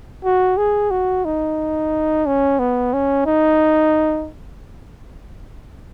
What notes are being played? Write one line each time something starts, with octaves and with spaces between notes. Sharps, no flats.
F#4
G#4
F#4
D#4
C#4
B3
C#4
D#4